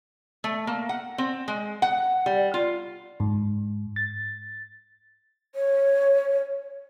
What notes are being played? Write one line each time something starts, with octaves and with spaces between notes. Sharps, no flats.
A3
A#3
F#5
C4
G#3
F#5
G3
F4
G#2
A6
C#5